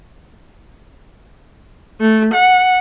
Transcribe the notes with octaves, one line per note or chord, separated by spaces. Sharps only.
A3
F#5